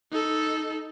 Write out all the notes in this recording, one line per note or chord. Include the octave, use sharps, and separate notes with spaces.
D#4 A4